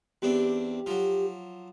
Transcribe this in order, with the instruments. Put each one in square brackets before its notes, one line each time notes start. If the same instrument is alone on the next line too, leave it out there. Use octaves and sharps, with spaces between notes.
[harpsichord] E2 C4 D4 [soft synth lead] G4
[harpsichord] F3 F#3